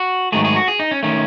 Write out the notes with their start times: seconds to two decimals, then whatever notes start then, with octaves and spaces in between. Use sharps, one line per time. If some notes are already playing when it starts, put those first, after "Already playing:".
Already playing: F#4
0.32 G#2 D#3 F#3 A3 G#4
0.44 G#4
0.56 F#4
0.68 G#4
0.80 D#4
0.91 C#4
1.03 D#3 A3 C#4